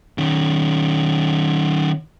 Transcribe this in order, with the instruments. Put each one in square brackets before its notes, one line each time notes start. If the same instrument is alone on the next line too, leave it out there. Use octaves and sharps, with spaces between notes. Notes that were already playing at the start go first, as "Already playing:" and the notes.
[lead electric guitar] D#3 C#4